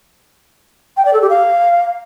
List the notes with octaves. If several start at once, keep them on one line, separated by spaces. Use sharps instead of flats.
G5
D5
A4
G4
F5